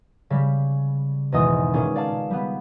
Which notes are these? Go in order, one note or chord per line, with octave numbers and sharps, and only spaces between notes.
C#3 G3
G#1 E2 B2 D#5 G#5 D#6
A#2 C#4 G#4
D5 F5 A5
G3 B3